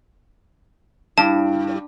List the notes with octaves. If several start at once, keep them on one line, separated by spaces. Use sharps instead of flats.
G2 E4 A5